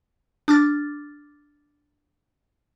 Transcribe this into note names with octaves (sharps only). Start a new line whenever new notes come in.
D4 D6 F6 A6